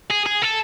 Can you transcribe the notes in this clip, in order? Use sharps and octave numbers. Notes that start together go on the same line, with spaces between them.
G#4
G#4
A4